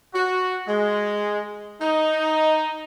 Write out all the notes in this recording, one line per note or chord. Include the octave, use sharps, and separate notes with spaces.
F#4
G#3
D#4